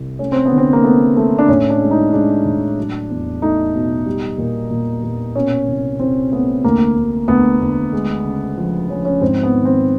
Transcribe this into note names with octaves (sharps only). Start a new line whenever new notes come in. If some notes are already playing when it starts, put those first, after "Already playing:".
Already playing: C2 C3
A3 C#4
C4
B3
D3
C4
A#3
A3 B3
A3
D4
A2 C#4
D4
G#3
D#4
G#3 D4
A2
F#3
E2
A3 D#4
B2
G3
A#2
A#2
A#2
B2 C#4
C2
C2 C4
A3 B3
D2 A#3
D2
D2 B3
D2
G#3
C#3
F3
F3 C#4
C#4
G#2 C4
B3
D#3
C4